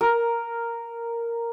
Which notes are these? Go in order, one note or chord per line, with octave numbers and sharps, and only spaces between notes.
A#4